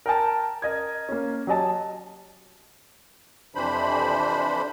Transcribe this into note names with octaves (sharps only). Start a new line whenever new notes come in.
A#4 G5 A5
A#4 D#5 G#6
A#3 C#4
F#3 G4 D#5 A5
F2 C3 E3 D4 C5 B5